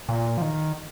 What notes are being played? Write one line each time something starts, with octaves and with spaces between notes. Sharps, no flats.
A#2
F3
D#3